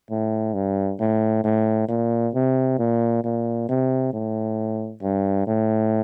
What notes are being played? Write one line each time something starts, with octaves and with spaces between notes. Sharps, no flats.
A2
G2
A2
A2
A#2
C3
A#2
A#2
C3
A2
G2
A2